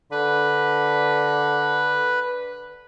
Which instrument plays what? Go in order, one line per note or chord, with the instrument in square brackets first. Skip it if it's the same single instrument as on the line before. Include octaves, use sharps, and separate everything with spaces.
[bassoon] D3 [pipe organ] B4